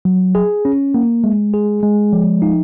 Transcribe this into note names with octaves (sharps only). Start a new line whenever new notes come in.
F#3
G#4
C#4
A#3
G#3
G#4
G#3
F3
D#4